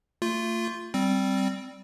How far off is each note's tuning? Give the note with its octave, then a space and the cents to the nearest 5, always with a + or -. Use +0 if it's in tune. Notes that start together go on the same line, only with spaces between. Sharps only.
A3 +40 F4 +0
G3 -10 C4 +0